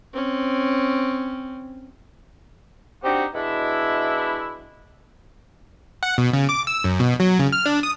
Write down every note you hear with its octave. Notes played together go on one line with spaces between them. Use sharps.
C4 C#4
C4 D4 D#4 F#4 G4
B2 G#3 D4 E4
F#5
B2
C#3
D6
E6
F#2
B2
F#3
C#3
F6
D4
D#6